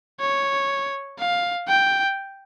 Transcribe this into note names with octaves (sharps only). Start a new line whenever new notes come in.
C#5
F5
G5